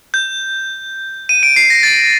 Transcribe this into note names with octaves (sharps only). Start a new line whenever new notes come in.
G6
D#7
D7
C7
A#6
A6